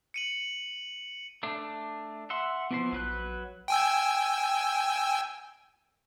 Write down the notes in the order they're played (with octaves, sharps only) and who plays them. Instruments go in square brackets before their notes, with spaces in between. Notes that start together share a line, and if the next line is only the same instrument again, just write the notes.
[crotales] C#7 D#7 F#7
[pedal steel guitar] A3 D4
E5 F#5 C6
[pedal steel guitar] E3 F3 C5 [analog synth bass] B3
[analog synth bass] A#1 [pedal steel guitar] F#3 B4 F#6
[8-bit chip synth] G5 G#5 E6